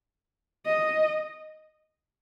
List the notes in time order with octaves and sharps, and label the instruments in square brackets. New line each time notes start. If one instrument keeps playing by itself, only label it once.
[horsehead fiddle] D#5